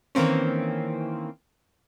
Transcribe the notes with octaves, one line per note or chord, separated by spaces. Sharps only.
D#3 E3 A#3 C4 C#4